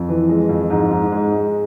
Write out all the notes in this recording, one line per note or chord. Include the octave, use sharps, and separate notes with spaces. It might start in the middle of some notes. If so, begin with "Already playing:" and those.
Already playing: F2
E3
G#3
F2
G#2
G#2
G#3
G#3